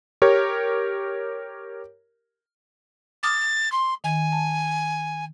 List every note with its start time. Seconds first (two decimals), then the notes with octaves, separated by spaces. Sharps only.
0.22 G4 A#4 C#5
3.23 D6 D#6 F6 A6
3.72 C6
4.04 D#3 G#5
4.32 A5